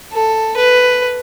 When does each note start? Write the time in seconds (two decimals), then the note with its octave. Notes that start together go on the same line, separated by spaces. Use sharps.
0.12 A4
0.57 B4